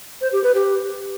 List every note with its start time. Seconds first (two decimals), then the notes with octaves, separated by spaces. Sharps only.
0.21 C5
0.32 G4
0.44 B4
0.55 G4